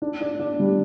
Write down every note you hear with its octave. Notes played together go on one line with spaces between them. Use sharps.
D4
D4
D4
G3